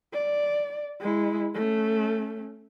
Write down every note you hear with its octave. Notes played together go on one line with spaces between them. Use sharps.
D5
G#3 E4
A3 C#4